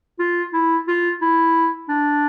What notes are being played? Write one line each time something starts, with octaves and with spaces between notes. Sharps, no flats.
F4
E4
F4
E4
D4